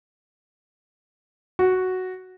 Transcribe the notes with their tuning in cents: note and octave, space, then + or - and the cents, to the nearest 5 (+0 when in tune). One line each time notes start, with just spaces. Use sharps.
F#4 +0